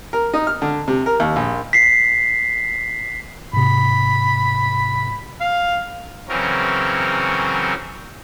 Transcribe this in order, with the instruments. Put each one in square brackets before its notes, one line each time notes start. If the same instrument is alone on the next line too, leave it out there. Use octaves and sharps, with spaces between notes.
[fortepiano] A#4
D#4
F6
D3
C3
A#4
D#2
A#1
[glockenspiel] B6 C7
[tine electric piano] G#2 C3 [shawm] B5
[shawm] F5
[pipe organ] C#3 E3 F#3 C4 C#4 A#4